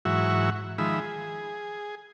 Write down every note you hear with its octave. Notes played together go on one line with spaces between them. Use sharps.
G#2 E3 F#3 F#4 E5 C#6
D#3 F3 G#3 E5 B5
G#4